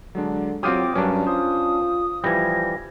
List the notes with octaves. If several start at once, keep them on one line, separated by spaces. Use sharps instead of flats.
D3 F#3 G#3 D4
F#3 C4 F4 G4 D6 D#6 F6 D#7
G2 F#3 C#4 D4 A#4
F4 C5 D#6
E3 F3 G3 G6 G#6 A#6